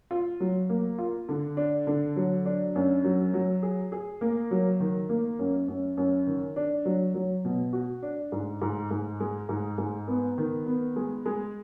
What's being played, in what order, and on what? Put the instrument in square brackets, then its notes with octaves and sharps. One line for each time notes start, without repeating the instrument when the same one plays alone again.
[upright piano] F4
F#3
A#3
F4
D3
D4
D3
F#3
D4
F#2
F#3
F#3
G#4
G#4
A#3
F#3
D#3
A#3
F#2
F#2
F#2
D#3
D4
F#3
F#3
B2
F#4
D4
G#2
G#2
G#2
G#3
G#2
G#2
B3
D#3
B3
G#3
G#3